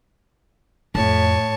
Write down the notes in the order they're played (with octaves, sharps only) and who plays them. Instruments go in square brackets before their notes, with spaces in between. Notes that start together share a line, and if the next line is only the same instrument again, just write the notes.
[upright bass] F2 [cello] A2 [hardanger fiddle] C#5 A5